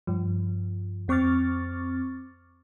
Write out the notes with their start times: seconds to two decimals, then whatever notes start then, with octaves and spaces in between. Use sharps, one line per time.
0.07 G2 F3
1.08 F2 C4 C#6 D6 F6 A6